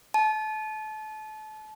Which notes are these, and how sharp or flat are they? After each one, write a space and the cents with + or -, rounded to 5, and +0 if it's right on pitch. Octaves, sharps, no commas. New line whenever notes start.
A5 -30